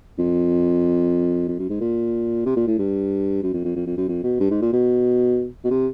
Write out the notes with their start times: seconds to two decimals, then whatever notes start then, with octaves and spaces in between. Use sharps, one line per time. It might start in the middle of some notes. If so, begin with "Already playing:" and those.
0.18 F2
1.48 F2
1.59 F#2
1.69 G#2
1.81 A#2
2.46 C3
2.57 A#2
2.67 A2
2.79 G2
3.43 F#2
3.53 F2
3.65 F2
3.76 F2
3.86 F2
3.97 F#2
4.08 F2
4.23 B2
4.40 G2
4.51 G#2
4.62 A#2
4.73 B2
5.64 B2
5.71 C3